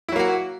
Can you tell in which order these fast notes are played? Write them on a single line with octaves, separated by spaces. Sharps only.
E4 F#3 A#3 F#4